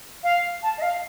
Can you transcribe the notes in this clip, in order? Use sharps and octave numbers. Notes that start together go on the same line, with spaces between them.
F5
A5
D#5
F5